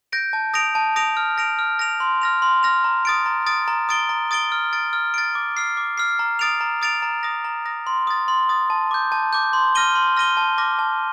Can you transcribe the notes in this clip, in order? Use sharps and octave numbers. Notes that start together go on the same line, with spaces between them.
G6 A#6 D7
A5
D#6 A#6 D7 F7
A5
D#6 A#6 D7 F7
F6
A#6 D7 F7
F6
A#6 D7 F7
C6
F6 A#6 F7
C6
F6 A#6 F7
A#5
D#6 A6 D7
A#5
D#6 A6 D7
A#5
D#6 A6 D7 G7
A#5
D#6 A6 D7 G7
F6
A6 D7
F6
A6 D7
D6
F6 C7
D6
F6 C7
A#5
D#6 A6 D7 F7
A#5
D#6 A6 D7 F7
A#5
D#6 A#6
A#5
D#6 A#6
C6
D#6 A6
C6
D#6 A6
A5
D6 G6
A5
D6 G6
C6
F6 A#6 D#7 G7
C6
F6 A#6 D#7 G7
A5
D6 F6 A#6
A5